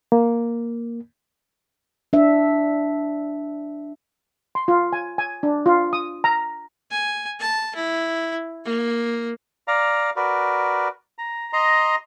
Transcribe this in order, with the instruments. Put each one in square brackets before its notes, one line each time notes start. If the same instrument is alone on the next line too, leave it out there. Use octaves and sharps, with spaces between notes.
[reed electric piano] A#3
[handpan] D4 E5
[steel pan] C6
F4
G#5
G#5
D4
F4
D#6
A#5
[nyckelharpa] G#5
A5
E4
A#3
[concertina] D5 F5 A#5
F#4 A#4 B4 D5
A#5
D#5 A#5 C6